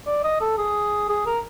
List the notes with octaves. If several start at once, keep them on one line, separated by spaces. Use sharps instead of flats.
D5
D#5
A4
G#4
G#4
A#4